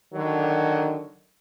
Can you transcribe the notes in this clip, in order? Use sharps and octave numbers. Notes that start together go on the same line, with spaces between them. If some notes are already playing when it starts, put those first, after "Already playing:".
D3 D#3 F#3